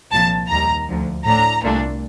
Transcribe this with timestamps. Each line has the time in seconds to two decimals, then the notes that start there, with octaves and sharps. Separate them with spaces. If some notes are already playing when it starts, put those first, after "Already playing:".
0.12 C2 A#2 F3 A5
0.50 D#2 D#3 G3 A#5
0.88 D2 D3 F3
1.25 A2 A3 D4 A#5
1.64 C2 A#2 A3 D4